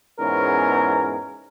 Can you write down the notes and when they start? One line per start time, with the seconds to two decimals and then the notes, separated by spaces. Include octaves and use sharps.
0.20 E2 G#2 B3 C#4 A#4